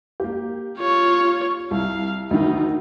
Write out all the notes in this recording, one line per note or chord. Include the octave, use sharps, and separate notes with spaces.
A#3 G4
F4 C#5
C2 F5
D2 D#3 D#4